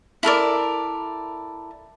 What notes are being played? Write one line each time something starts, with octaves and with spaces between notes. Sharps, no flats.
E4 A4 A#4 D5